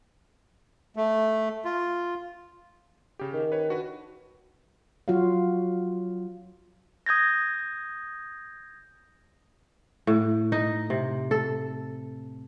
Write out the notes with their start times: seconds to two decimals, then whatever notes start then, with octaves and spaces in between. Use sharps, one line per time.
0.96 A3
1.65 F4
3.19 C#3 G4
3.33 D#3
3.52 B4 C#5
3.69 D4 F#4 B4
5.08 F#3 F4 F#4 C#5 F5
7.06 D#6 G6 G#6 A#6
10.07 A2
10.52 D#4
10.90 C3
11.31 A4